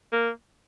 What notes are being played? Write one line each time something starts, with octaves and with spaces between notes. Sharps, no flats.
A#3